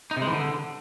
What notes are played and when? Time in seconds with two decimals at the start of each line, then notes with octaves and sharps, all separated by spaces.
0.11 D#4
0.16 C3
0.22 G#3
0.27 E3
0.33 D3